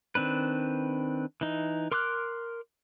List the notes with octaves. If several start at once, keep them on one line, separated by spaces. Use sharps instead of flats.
D#3 C4 D4 B4
E3 D#4
A#4 C6 D6 F6 F#6